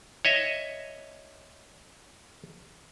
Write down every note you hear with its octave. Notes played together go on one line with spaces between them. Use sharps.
C#5 D#5 E5